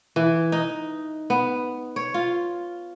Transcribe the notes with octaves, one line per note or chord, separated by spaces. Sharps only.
E3
D#4
B3
C#5
F4